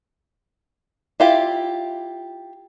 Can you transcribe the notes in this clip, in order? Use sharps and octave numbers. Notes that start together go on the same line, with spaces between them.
E4 F4 G4